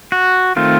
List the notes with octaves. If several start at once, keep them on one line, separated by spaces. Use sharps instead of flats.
F#4
D#3 A3 C4 F4